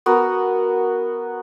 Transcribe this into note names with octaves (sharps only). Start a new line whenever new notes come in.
B3 F#4 A#4